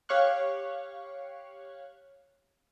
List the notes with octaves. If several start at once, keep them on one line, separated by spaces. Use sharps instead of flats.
G4 C#5 F5 C#6 F#6